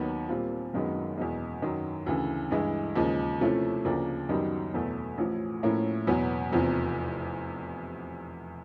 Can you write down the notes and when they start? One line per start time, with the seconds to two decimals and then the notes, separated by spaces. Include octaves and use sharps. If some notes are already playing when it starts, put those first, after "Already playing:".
Already playing: D#2 D#3 F#3 B3
0.29 A#2 G3 C4 F4
0.73 F#1 F#2 D#3 G#3 B3
1.18 E2 B2 G#3
1.62 F#2 D#3 F#3
2.06 D2 C#3 E3
2.51 G2 E3 G#3
2.96 D#2 C#3 F3 G#3
3.40 C3 F3 A3 C#4 E4
3.85 D2 C#3 F3 A#3 D4
4.29 F#2 D#3 G3 B3 D#4
4.74 E2 B2 F#3 A3
5.18 A1 A2 F3
5.63 A2 F3 A#3 C#4 E4
6.07 E2 B2 F#3 B3
6.52 F1 E2 C3 F3